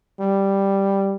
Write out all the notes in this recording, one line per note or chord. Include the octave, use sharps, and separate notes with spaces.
G3